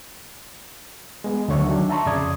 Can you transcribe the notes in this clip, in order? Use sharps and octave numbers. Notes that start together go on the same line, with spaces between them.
G#3 B3
D2 D3 F#3 C#5 E5 C#6
D#3 F#3 D4
E5 A5 A#5 C6 C#6
F2 C#3 D5 D#6 G#6